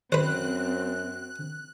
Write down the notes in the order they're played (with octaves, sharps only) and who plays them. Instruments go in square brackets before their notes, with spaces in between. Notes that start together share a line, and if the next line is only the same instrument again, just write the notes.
[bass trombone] F#2 [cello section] C4 [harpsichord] B4 C5 [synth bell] F#6